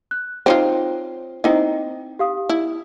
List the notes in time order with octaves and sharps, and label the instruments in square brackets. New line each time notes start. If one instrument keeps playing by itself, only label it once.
[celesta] F#6
[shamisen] C4 D#4 F4 [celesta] C5 C#5
[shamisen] C4 D#4 E4 [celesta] D#5
[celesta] G4 F5 D#6
[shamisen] E4